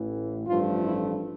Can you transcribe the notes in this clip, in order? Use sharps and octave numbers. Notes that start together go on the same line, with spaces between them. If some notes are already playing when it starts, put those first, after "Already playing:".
Already playing: A1 A2 E3
A1 G2 F3 A3 F4
E4